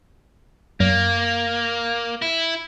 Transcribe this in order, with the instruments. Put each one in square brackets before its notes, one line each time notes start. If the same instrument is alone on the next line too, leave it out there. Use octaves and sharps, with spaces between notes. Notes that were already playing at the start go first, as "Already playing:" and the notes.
[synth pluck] F#2 [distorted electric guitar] A#3
[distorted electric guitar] E4